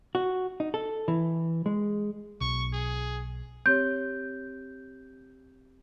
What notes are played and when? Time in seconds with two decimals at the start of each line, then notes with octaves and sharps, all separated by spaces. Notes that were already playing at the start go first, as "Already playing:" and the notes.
0.15 F#4
0.60 D#4
0.74 A4
1.08 E3
1.66 G#3
2.41 B1 C#6
2.73 G#4
3.66 C4 G4 C#5 G6